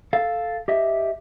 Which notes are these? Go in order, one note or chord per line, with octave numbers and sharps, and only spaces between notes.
A4 F5
G4 D#5 E5